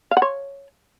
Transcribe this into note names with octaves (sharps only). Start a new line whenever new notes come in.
F5
F#5
C#5